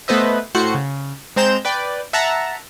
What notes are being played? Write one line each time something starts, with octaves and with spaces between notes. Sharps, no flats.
A3 B3 B4 C5 D#5 E5
A2 F#4 A4 C5 F#6 C#7
C#3
G#3 C4 C5 A#5 G6 E7
B4 D5 G5
E5 F#5 A5 A#5